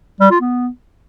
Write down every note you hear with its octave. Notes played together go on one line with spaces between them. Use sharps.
G3
F4
B3